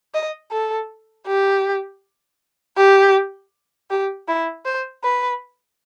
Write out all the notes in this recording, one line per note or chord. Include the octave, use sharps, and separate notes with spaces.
D#5
A4
G4
G4
G4
E4
C5
B4